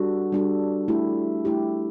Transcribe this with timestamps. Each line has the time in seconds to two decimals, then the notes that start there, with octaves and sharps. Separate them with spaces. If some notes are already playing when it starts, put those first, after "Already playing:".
Already playing: G3 D4 F#4 A4
0.32 G3 D4 F#4 A4
0.88 A3 E4 G4
1.45 A3 E4 G4